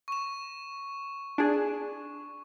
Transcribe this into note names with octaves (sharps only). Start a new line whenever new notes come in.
C#6 E7
D4 G#4